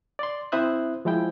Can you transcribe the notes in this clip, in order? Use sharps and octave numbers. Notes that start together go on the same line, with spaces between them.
D5 C6
C4 E4 C5 E5 D#6 F#6
F3 G#3 E4 G5